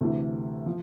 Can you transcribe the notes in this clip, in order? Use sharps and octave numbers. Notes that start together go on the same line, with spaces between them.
D2 C3 E3 A3 E4
F3